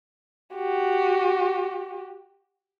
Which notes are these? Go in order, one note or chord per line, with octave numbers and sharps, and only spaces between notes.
F#4 G4